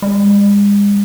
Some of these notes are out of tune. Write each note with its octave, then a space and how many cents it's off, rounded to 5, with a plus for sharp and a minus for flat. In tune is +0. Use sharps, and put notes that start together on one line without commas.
G#3 -40